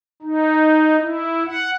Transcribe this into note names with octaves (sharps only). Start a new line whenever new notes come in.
D#4
E4
F#5